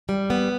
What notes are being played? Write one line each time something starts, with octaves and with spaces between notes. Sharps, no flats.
G3
B3